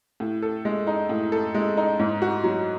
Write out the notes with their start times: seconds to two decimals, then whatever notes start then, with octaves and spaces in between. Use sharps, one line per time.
0.20 A2
0.42 A4
0.65 G#3
0.87 D#4
1.09 A2
1.32 A4
1.54 G#3
1.77 D#4
1.99 G#2
2.22 F#4
2.44 F#3